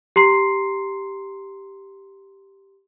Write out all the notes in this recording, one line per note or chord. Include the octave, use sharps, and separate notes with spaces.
G4 A#5 C6 C7